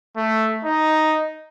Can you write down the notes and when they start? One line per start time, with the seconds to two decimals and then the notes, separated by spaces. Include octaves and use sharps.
0.17 A3
0.65 D#4